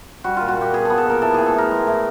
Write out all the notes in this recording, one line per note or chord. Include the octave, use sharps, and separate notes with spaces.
G3 F#4
A#2 F4
F#4
A#2 G4
B3 G#4
B3 A4
A4
A#2 A#4
E3 A4
A2 G#4
A4
A2 A#4
G#3
A2